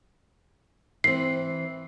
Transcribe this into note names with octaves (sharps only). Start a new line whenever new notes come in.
E3 C4 C7